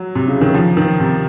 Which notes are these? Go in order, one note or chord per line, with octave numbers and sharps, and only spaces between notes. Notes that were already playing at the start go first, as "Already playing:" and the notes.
Already playing: F#3
C3
C#3
D#3
F3
D#3
C3